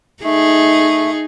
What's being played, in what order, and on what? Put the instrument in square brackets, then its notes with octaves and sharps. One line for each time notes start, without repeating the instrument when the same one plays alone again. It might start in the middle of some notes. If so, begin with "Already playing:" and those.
[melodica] A3 [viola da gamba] D#4 G#4